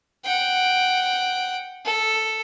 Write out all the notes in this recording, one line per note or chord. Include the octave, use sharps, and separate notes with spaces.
F#5 G5
A4